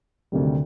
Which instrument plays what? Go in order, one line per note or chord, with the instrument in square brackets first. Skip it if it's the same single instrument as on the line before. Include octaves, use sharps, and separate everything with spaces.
[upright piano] D2 C3 D#3 G3